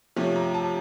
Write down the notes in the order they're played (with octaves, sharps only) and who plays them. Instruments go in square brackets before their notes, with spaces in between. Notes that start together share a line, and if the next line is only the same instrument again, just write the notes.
[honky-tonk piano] C3 F3 A3 C#4
A#5
A5